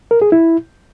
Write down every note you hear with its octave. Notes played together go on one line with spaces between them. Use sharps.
A#4
G#4
E4